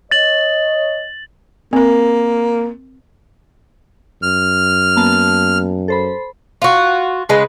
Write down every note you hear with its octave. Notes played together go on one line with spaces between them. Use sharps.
C#5 D#5 A6 F#7
A#3 C4 A#4
F#2 F6
A#3 B3 A5
A4 C5 B5
F4 F#4
C#3 G#3 B4